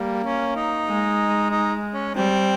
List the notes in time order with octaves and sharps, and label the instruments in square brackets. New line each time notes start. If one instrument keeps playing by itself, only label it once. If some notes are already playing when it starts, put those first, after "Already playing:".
Already playing: [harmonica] G3 [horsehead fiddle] A#3
[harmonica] C#4
D#4
[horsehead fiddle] G#3
[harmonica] D#4
C#4
[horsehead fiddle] G3 [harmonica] C4